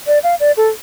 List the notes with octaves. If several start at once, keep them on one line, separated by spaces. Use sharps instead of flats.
D5
F5
D5
A4